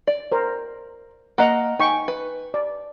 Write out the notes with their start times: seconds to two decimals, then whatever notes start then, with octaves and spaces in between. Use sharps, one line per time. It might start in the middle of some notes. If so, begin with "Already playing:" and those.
0.07 D5
0.32 A#4 C5
1.38 A#3 D#5 F#5 A#5
1.79 D#4 G5 G#5 C#6
2.08 B4
2.54 D5